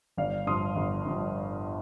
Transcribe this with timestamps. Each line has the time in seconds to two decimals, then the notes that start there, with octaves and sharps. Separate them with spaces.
0.17 G1 D5 F5
0.47 G2 F3 C6 D#6
0.76 G1
1.06 G2 F3